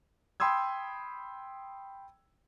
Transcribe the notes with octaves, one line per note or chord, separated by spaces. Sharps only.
G5 B5 C6 D#6 E6 G#6